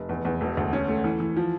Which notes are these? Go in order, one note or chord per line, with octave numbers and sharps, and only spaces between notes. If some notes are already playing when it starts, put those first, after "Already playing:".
Already playing: F1
E2
E2
E1
D2
C#4
A3
E3
E3
F3